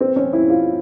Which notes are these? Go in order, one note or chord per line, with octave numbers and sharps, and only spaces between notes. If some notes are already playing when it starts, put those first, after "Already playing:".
C4
C#4
E4
F4